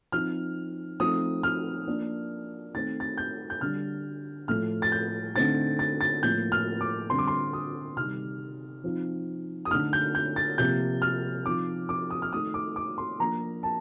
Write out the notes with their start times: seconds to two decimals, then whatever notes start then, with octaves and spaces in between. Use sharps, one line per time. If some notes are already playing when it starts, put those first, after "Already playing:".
0.12 F3 C4 D#4 F6
1.00 F3 A3 C4 D#4 D#6
1.43 F6
1.87 F3 A#3 D4
2.74 D#3 A3 C4 A6
3.00 A6
3.18 G6
3.50 G6
3.61 D3 G3 D4 F6
4.48 A2 F3 A3 F6
4.82 A6
4.92 G6
5.35 D3 A3 C4 D#4 A6
5.79 A6
6.01 A6
6.23 A2 F3 A#3 G6
6.52 F6
6.81 D6
7.10 D3 G3 C4 C6
7.19 D6
7.27 C6
7.53 D#6
7.97 C3 D#3 G3 F6
8.84 F3 C4 D#4
9.65 D#6
9.71 D3 A3 D#4 F6
9.93 G6
10.15 G6
10.36 A6
10.58 C3 F3 A#3 G6
11.02 F6
11.45 F3 C4 D#4 D6
11.89 D6
12.10 D#6
12.22 F6
12.33 D#3 A3 D#4 D#6
12.54 D6
12.76 D6
12.98 C6
13.20 F3 A#3 D4 A#5
13.63 A5